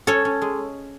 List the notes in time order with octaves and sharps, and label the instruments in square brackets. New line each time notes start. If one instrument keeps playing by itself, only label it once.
[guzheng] C#4 A4 C#5
C#4
G#3